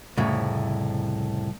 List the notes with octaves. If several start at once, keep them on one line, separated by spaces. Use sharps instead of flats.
C2 F2 A2 C#3